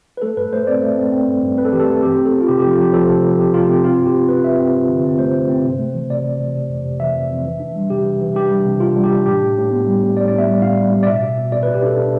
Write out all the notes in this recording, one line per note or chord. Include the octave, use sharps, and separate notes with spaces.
B4
A3 A4
G2 B4
A3 C5
C4 D5
A3
C4
C4
G2
G2
C4 B4
A4
E3 G4
A4
A3
C4 G4
C4
A4
C4
F4
C3 G4
F3 G4
F4
F3 G4
F3 A4
C3
F3
C3 G4
C3 F4
C4 G4
C4 F4
G2
G4
C4
C4 B4
G2 E5
C4
G2
D3
C4
A3 C5
G2
C4
C3
A3
E3
C3 D5
C3
C3
C3
F2
C3
E3 E5
F2
F2
E3
D4
G3
C3 G4
E3
E3
D4 G4
G3
C3
D4 F4
G3
G4
D4
A2 G4
A2
A2
B3
G3
A2
A2 D5
B3 D5
E5
G3
A2 F5
G3
G3
D5
B2 E5
B2
B2
B2 D5
B2 B4
G4
D4 A4
D4